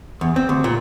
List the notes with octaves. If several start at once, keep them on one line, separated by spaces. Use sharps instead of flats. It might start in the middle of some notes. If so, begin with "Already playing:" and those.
E2
C4
D2
A#2